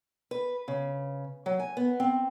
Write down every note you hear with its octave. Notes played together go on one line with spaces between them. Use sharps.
B4
C#3
F#3
G#5
B3
C4